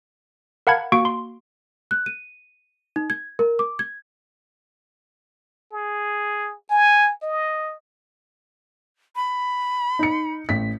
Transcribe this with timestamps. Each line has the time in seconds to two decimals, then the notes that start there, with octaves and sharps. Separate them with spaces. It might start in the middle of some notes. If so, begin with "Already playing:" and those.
0.67 A#4 F5 F#5 A5 B5 G#6
0.92 A#3 F#4 C#6 D7
1.05 C6
1.91 F#6
2.06 D#7
2.96 D#4
3.10 G#6
3.39 A#4
3.59 D6
3.79 G#6
5.73 G#4
6.70 G#5
7.23 D#5
9.16 B5
9.99 D#4 C#7
10.49 A1 B6